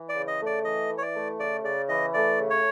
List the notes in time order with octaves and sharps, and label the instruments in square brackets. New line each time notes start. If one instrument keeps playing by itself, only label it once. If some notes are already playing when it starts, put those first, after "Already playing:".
Already playing: [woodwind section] E3
[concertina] D5
[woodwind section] C#3
[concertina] D#5
[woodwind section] A3
[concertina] D5
[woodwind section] E3 [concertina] D#5
[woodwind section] E3
[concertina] C#5
D5
[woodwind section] A3
[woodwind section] C#3 [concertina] D5
[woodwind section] C#3 [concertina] D5
[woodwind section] E3 [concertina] D#5
[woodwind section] A3 [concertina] D5
[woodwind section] C#3
[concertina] C#5